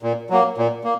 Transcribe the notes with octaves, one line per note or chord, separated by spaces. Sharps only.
A#2
F#3 A#3
A#2
A#3